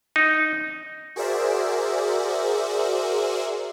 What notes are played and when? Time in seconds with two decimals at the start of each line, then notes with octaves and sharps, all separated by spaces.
0.16 D#4
1.16 F#4 G#4 A#4 C5 D5 E5